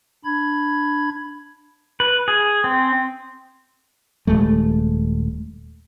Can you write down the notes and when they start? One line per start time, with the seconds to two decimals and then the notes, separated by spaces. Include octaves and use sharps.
0.25 D4 B5 G#6
2.00 B4
2.28 G#4
2.64 C4
4.27 D#1 F2 G#3 A3